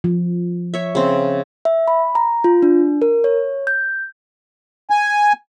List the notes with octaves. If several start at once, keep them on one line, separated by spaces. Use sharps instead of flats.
F3
C#5 E5
C#3 C4
E5
B5
A#5
F4
D4
A#4
C#5
G6
G#5